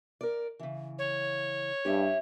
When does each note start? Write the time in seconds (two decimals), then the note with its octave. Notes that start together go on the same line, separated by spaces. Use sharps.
0.21 A#4 D5
0.59 C#3 E3
0.99 C#5
1.85 G2 C#4 G4 E5